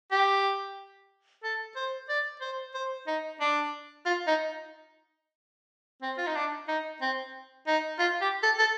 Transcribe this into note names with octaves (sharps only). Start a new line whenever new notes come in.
G4
A4
C5
D5
C5
C5
D#4
D4
F4
D#4
C4
F4
D#4
D4
D#4
C4
D#4
F4
G4
A4
A4